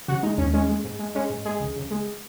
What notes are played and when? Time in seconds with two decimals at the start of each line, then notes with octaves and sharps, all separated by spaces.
0.08 C#3 F#4
0.23 G#3 D#4
0.38 D#2 C#4
0.53 G#3 C#4
0.69 G#3
0.84 G#2
0.99 G#3
1.15 G#3 C#4
1.30 G#2
1.45 G#3 G#4
1.60 C#2
1.76 C#2
1.91 G#3